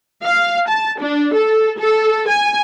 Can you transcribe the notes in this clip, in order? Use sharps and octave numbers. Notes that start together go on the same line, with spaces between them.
F5
A5
D4
A4
A4
G#5